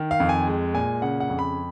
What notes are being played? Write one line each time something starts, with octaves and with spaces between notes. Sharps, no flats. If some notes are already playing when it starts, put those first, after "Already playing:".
Already playing: D#3
F5
F2
G#5
G#3
A#2 G#5
C#3 F#5
F#5
F2
B5